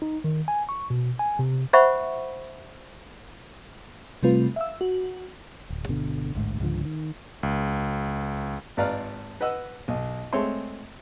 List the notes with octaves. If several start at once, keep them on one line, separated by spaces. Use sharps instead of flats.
D#4
D#3
G#5
C#6
B2
G#5
C3
C5 E5 F#5 B5 C#6
C3 G3 A3 C4 F4 B4
E5 F5 E6
F#4
D1
G1 B2 D3
A1 D2 G#2
C#2 G#2 D3 F3
D#3
C#2
G#1 B4 D5 F5 A#5 F6
B4 D#5 F#5 E6
B1
G#3 A3 C4 C#5 E5 C6